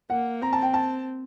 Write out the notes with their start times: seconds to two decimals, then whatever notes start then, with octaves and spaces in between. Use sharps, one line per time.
0.10 A#3 F#5
0.41 C4 A#5
0.53 A5
0.62 G5
0.74 A5